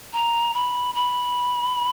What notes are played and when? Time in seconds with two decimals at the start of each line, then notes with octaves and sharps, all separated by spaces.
0.13 A#5
0.54 B5
0.95 B5